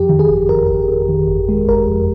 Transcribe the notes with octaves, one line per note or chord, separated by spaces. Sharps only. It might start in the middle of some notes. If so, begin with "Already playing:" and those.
Already playing: F2 G4
D#3
G#4
G1
F2 A#4
G1
D#3
D#3
G1
G#3
G1 A#4
F2